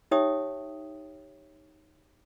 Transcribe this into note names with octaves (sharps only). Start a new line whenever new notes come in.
D#4 G4 C#5 E5 G5 D#6